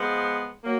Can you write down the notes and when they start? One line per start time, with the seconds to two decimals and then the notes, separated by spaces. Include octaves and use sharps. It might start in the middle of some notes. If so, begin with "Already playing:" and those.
Already playing: F3 G#3 B3
0.64 F#3 A#3